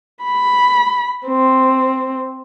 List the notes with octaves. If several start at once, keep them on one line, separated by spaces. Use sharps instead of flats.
B5
C4